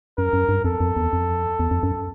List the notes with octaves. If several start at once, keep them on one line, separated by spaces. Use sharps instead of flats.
F#2 A#4
F#2
G2
F2 A4
F2
E2
F2
E2
F2
F#2